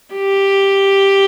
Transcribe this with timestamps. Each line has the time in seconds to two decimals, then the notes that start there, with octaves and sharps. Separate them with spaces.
0.15 G4